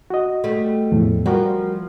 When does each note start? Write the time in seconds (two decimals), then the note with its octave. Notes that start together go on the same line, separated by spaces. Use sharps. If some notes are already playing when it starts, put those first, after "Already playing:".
0.10 F#4 D#5
0.44 G3 A3
0.92 E2 A2 F3
1.26 F3 G3 F#4 A#4